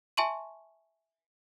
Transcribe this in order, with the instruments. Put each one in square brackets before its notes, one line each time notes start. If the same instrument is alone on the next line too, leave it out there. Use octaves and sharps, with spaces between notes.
[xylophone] E5 G#5 A5 C6 C#6 D#7